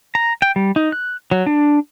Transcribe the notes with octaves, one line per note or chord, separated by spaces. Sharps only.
A#5
G5
G3
D#4
F#6
F#3
D4